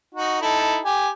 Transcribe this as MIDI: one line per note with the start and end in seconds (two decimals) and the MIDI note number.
0.15 0.40 63
0.15 0.40 66
0.42 0.79 63
0.42 0.79 64
0.42 0.79 69
0.84 1.08 67
0.84 1.08 80